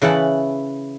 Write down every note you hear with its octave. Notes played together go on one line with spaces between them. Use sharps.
C#3 E3 B4 F#5 A5 B5